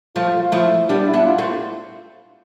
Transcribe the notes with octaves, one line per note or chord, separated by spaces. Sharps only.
F3 A3 F4
F4
F3 A3 E4
G3 B3 D4
E4
B3 D4
F4
A3 C4